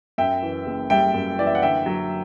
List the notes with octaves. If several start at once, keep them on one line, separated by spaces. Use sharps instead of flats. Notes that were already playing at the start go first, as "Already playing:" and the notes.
F#2 E5 G5
E3
F#1
G3 E5 G5
F#2
E3 D5
E5
F#5
D3 E5 G5
F#3